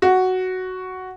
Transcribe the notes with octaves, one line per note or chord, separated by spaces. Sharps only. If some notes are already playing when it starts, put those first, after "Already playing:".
F#4